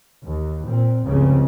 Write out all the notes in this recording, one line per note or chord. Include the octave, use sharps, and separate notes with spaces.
D#2
A#2 C4
F1 C#2 G2 C#3 C4